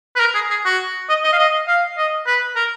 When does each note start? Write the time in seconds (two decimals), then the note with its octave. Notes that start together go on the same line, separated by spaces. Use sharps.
0.16 B4
0.20 A#4
0.35 G#4
0.50 G#4
0.65 F#4
1.09 D#5
1.24 D#5
1.33 F5
1.38 D#5
1.68 F5
1.97 D#5
2.27 B4
2.56 A#4